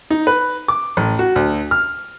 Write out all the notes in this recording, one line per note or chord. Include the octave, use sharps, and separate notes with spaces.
D#4
B4
D6
A1
F#4
D2
F6